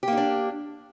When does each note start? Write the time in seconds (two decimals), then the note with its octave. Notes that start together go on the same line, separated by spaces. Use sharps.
0.03 G4
0.08 A#3
0.13 D#4
0.17 D4